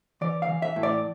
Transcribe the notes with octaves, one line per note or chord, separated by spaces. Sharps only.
E3 D5
F5
E3
E5
A2
D5